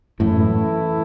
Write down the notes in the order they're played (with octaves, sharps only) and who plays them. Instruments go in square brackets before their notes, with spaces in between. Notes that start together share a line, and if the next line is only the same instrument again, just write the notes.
[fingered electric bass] F#2 A2 [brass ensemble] E3 A3 E4